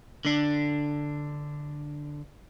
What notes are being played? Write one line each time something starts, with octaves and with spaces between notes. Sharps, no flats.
D3 D4